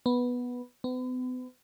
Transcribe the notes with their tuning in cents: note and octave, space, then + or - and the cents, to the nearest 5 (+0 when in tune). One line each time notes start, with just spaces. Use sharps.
B3 -5
B3 +40